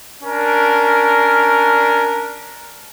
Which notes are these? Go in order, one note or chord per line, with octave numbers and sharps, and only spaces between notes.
C#4 D4 A#4